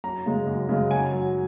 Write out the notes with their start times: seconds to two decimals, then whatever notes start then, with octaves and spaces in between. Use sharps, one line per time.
0.04 F#2 A#5
0.26 C#3 G#3
0.47 F#2
0.69 C#3 G#3
0.91 F#2 G#5
1.12 F#3